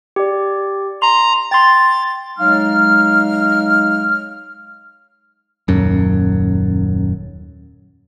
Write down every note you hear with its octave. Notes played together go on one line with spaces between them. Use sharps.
G4 D5
A#5 C6
G5 C6 A6
F#3 G#3 D#4 F5 F6
D#1 F#2